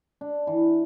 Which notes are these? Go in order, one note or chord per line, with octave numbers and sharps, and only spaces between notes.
D4
E3